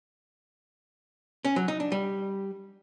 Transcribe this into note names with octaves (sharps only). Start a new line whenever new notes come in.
C#4
F#3
D#4
D4
G3